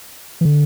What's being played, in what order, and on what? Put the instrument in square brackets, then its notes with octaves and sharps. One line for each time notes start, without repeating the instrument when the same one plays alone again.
[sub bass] E3
D3